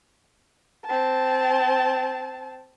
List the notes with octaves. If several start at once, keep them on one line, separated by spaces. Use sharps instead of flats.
C4 A5